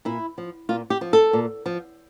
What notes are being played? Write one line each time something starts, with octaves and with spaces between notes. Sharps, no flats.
A#2 E4
F3
A#2 F4
G4
F3
A4
A#2
F3